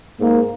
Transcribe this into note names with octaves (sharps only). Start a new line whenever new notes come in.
G#2 A#3